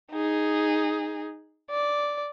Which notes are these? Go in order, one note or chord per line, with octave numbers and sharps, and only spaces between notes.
D#4 G#4
D5